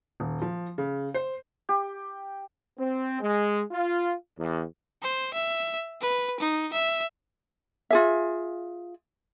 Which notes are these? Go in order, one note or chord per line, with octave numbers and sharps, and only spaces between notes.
D#1
F3
C#3
C5
G4
C4
G#3
F4
E2
C5
E5
B4
D#4
E5
F4 G#4 E5